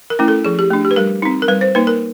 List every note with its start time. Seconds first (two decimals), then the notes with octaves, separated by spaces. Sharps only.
0.10 A#4
0.19 A3 C#4 E4
0.28 A4
0.45 F3 G#4
0.59 G4
0.70 A3 D4
0.85 G4
0.91 B4
0.96 G3 A#4
1.22 C4 D#4
1.42 A#4
1.48 G3 B4
1.61 C5
1.75 A#3 D#4 B4
1.87 A#4